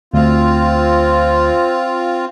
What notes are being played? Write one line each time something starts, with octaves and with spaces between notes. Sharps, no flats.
D2 C4 F4